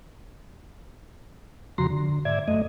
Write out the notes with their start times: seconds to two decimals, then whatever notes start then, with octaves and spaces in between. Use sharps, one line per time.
1.78 F2 C#3 F3 F#4 A#5 C6
1.90 D3
2.25 G#2 D5 E5 G#6
2.48 F#2 A3 D#5